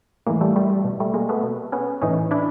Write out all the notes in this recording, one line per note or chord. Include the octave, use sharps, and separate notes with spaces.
A2 E3 G#3 A#3
G3 A3
G3 A3
G3
B2
G3 A3
G#3 A#3
A3 B3
B2
B3 C#4
A2 E3 C#4 D#4
D4 E4